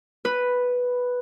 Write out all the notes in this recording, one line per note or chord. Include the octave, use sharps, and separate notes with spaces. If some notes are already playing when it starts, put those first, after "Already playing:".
B4